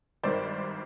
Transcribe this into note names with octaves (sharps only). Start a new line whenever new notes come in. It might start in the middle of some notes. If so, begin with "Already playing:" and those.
G#1 G2 D#3 C5 D5